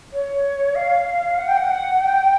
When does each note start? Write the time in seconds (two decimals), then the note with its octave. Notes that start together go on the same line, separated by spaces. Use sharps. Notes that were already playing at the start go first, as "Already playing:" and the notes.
0.13 C#5
0.75 F5
1.38 F#5
1.48 G5
1.57 F#5
2.01 G5